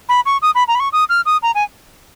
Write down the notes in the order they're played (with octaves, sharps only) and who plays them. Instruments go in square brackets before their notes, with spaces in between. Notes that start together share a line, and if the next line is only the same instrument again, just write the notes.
[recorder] B5
C#6
D#6
B5
A#5
B5
C#6
D#6
F6
D#6
A#5
G#5